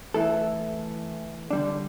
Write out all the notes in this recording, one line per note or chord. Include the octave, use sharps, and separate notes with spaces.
E3 A3 E4 A4
D3 G3 D4